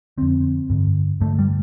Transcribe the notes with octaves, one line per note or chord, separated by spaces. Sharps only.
F2 D3 C4
G2 D3
G2 D3 A3
G3